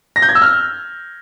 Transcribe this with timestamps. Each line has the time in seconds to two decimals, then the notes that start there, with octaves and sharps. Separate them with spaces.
0.16 A#6
0.22 G6
0.29 G#6
0.35 E6
0.42 F6